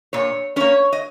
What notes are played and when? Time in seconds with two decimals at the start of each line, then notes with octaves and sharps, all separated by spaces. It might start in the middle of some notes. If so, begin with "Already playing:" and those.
0.13 A#2 C#5
0.56 A#3 C#4 C#5
0.92 D#5